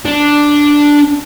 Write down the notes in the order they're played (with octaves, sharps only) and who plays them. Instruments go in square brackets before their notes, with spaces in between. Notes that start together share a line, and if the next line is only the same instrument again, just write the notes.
[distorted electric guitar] D4